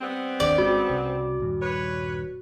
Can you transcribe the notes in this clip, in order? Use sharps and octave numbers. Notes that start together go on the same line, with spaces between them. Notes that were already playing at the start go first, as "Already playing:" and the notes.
G3 B3 C4
G1 D#2 D3 D5
G1 G#3 C#4 F#4
C2 C#3
D#1 G2
B4 C#5